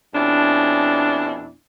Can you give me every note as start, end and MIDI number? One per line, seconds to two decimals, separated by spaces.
0.13 1.52 41
0.13 1.52 47
0.13 1.52 61
0.13 1.52 62
0.13 1.52 64